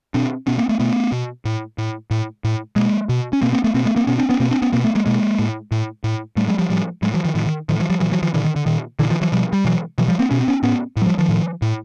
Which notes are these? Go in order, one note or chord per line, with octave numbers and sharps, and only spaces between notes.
B2 C4 D4
B2 B3 C#4
A#3 C4
A3 B3
B2 A3 B3
B2
A2
A2
A2
A2
B2 G#3 A#3
B2
C#4
B2 A#3 C4
A#3 C4
A3 B3
B2 A#3 C4
A3 B3
A#3 C4
B2 B3 C#4
C4 D4
B3 C#4
B2 A#3 C4
C4 D4
B3 C#4
B2 A#3 C4
A3 B3
G#3 A#3
B2 G#3 A#3
A2
A2
A2
A2 G3 A3
F#3 G#3
F3 G3
A2 F3 G3
A2 F#3 G#3
E3 F#3
D#3 F3
A2 D#3 F3
D#3
A2 D#3 F3
E3 F#3
F3 G3
A#2 E3 F#3
E3 F#3
D#3 F3
A#2 D3 E3
D#3
D3
A#2 D#3
A#2 D3 E3
D#3 F3
E3 F#3
B2 F3 G3
G3
B2 E3 F#3
B2 E3 F#3
F3 G3
A#3 C4
B2 C#4
C4
B3 C#4
A2 B3 C#4
A2
F#3
F3 G3
D#3 F3
A2
A2